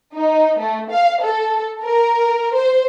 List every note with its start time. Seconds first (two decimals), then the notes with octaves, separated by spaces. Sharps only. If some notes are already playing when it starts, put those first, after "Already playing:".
0.14 D#4
0.59 A3
0.91 F5
1.22 A4
1.83 A#4
2.54 C5